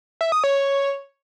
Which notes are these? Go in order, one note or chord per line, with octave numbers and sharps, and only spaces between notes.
E5
D#6
C#5